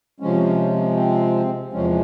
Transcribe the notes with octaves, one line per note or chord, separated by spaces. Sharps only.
C3 F3 G#3 C#4
C4
E2 C3 F3 G#3 C#4